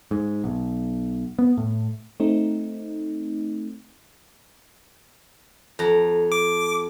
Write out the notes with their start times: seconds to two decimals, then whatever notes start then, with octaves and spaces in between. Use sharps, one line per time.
0.11 G#2
0.44 B1
1.39 B3
1.57 A2
2.20 A3 C4 D#4
5.79 F2 A#5
6.32 D6